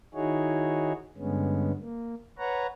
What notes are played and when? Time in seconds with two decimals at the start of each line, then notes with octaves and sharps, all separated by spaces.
0.14 D#3 D#4 E4 F#4 G#4 C#5
1.18 G2 D3 G#3 B3 C#4
1.80 A#3
2.38 B4 C#5 F#5 A#5